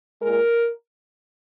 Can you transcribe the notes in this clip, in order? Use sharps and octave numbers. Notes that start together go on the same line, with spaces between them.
A#2 G#3 A#4